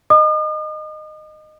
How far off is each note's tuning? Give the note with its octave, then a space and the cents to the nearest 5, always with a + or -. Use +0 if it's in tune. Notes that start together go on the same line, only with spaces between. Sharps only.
D#5 -15 D#6 -45